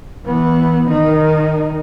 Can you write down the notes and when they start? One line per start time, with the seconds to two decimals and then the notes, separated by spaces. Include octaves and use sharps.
0.25 E3 B3
0.88 D#3 D#4